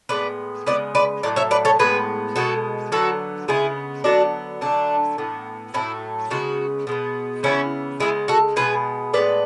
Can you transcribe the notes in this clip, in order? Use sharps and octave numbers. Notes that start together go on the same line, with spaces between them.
A2 G#3 B3 B4 D5
C#3 G#3 B3 B4 D5
B4 D5
A2 F#3 A3 D5
C#5 E5
B4 D5
A4 C#5
A2 G#3 B3 G#4 B4
B2 G#3 B3 F#4 A4
D3 F#3 B3 F#4 A4
C#3 G#3 B3 E4 G#4
D3 F#3 B3 D4 F#4
D3 F#3 A3 D4
A2 E3 B3
A2 F#3 A3 C#4 E4
C#3 G#3 B3 D4 F#4
B2 G#3 B3
C#3 E3 B3 C#4 E4
C#3 G#3 B3 E4 G#4
F#4 A4
B2 G#3 B3 G#4 B4
A2 G#3 B3 B4 D5